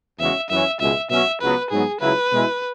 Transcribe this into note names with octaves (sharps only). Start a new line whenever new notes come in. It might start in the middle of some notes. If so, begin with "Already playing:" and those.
E2 C#3 G#3 C#4 F#4 E5
F#2 E3 C#4 E5
C#2 B2 G#3 E5
B2 F#3 C#4 F#4 E5
C#2 C#3 F#3 B3 B4
G#2 F#3 B3 G#4
C#2 C#3 F#3 E4 B4
B2 G#3 E4